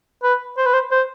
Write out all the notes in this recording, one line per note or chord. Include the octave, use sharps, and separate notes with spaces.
B4
C5
B4
C5
C5